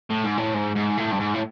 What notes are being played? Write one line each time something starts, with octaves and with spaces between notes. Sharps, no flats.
A2
G#2
A2
G#2
G#2
A2
G2
G#2
A2